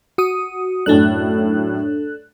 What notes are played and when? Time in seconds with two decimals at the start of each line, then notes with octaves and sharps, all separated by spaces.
0.18 F#4 D#6
0.86 F#2 A2 D4 A4 F#6